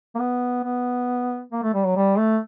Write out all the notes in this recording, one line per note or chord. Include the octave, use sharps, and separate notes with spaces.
A#3
B3
B3
A#3
A3
G3
F#3
G3
A3